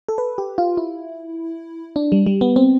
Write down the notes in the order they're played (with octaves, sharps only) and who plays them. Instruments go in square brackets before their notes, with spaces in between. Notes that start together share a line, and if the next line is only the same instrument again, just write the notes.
[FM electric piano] A4
B4
G4
F4
E4
D4
G3
G3
B3
C4